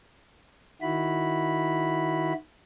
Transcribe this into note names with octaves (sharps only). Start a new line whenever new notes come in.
D#3 E4 F#4 B5